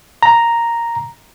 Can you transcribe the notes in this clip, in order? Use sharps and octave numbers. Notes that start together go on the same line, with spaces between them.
A#5